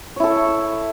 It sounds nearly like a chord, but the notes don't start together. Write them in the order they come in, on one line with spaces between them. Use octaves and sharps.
C#5 E4 A4